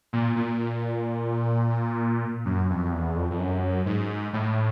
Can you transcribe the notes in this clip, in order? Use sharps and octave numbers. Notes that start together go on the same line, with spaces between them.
A#2
A#2
F#2
F2
E2
F2
F2
F#2
G#2
A2